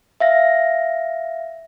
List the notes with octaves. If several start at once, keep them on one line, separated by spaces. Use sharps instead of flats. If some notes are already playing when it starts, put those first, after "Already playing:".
E5 F5 A#6